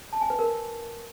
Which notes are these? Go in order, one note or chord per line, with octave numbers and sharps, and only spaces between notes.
A5
G#5
B4
A#4